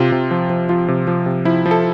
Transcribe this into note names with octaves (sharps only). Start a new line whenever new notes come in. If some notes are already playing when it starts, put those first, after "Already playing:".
Already playing: C3 F4
C3
F3
F3
F3 F4
C3
F3
C3
F3 E4
F3
A4